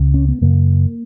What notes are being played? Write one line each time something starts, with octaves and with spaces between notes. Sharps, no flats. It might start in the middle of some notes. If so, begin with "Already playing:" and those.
Already playing: C#2 C#3
C#4
B3
F#2 C#3 A#3